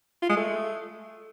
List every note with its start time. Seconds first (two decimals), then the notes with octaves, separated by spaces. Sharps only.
0.22 F4
0.29 G#3
0.37 A3